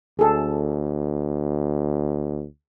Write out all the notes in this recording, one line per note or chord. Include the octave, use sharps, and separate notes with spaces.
D2 G#4 A4